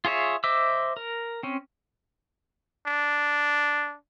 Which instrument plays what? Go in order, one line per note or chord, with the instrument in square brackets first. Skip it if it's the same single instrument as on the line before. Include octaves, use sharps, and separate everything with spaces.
[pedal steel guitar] F4 G#4 C#5 E5
C5 D#5 E5 D6 E6
A#4
C4 C#4
[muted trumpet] D4